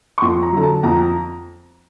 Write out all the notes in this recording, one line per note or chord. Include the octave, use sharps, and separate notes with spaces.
C#6
F2 C6
A#5
D3 F#3 A#5
A5
F2 A#5